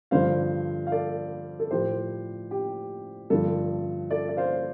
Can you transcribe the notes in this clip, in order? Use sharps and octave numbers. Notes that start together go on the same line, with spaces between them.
G2 D3 F3 C5 F5
F5
A4 D5
A4
A2 F3 G4 C5
G4
G2 D3 F3 A4
A4 D5
D5
C5 F5